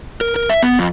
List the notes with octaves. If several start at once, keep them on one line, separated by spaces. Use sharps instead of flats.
A#4
A#4
E5
B3
F2